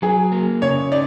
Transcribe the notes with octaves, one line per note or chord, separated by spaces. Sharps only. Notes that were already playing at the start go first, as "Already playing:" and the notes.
F#3 G#4
A#3
C#3 C#5
D#4 D5